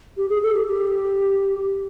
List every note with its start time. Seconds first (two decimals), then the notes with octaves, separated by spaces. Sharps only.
0.17 G4
0.30 G#4
0.43 A4
0.54 G4
0.67 G4